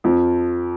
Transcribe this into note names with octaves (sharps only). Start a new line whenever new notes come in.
F2 F3